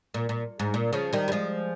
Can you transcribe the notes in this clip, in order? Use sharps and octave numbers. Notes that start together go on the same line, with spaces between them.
A#2
A#2
G#2
A#2
C#3 F3
D#3 G3
G3
F3 G#3